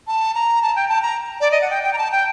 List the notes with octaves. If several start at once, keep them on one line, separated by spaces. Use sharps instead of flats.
A5
A#5
A5
G5
A5
A#5
D5
D#5
F#5
G5
G5
A#5
A5
G5